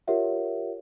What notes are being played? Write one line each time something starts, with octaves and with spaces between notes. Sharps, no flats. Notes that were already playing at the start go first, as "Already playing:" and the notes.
F4 G4 A#4 C#5 E5 F#5